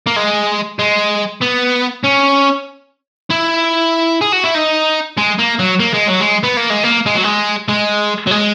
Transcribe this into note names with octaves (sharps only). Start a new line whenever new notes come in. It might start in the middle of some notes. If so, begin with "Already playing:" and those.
A#3
G#3
G#3
B3
C#4
E4
G#4
F#4
E4
D#4
G#3
A#3
F#3
A#3
G#3
F#3
G#3
B3
A#3
G#3
A#3
G#3
F#3
G#3
G#3
F#3
G#3